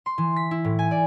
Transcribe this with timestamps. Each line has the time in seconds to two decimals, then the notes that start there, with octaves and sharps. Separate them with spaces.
0.06 C6
0.18 E3
0.36 B6
0.51 E4
0.65 A2
0.79 G#5
0.91 D5